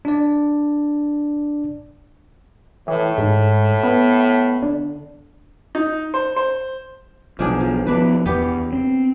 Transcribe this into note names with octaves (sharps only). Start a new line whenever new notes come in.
D4 D5
A2 E3
G#2
B3
D3
D#4
C5
C5
B1 F3 D4 G#4
F3
F3 B3 D4 B4
E2 B3 G4
C4